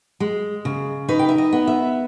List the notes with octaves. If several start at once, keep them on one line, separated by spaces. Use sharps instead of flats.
G#3
C#3
D#4 B4
G5
E5
D#5
B3
E5